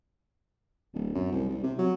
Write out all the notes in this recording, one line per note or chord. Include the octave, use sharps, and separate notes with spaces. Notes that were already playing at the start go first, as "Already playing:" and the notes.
D1
F#2
C2
C2
C3
F#3